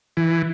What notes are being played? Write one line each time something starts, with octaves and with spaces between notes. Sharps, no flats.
E3